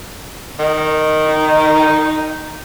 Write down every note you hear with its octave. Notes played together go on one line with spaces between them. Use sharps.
D#3
D#4